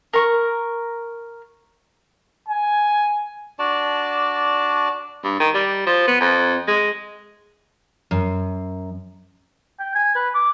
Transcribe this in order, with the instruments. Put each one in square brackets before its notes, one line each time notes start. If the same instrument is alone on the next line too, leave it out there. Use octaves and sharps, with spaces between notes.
[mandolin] A#4 C#6
[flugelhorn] G#5
[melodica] D4 F#4 D5 A5
[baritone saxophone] G2
D#3
G3
F3
B3
F2
G#3
[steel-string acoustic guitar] F#2
[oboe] G5
G#5
B4
D6